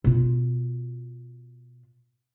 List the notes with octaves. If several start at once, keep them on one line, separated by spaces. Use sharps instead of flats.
B2 F4